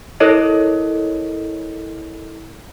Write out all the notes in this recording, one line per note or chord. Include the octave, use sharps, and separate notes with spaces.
E4 A4 A#4 C#5 D#5